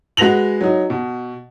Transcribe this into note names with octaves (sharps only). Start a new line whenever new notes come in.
G#3 F#4 B4 A#6 F7 F#7
F#3 D#4
B2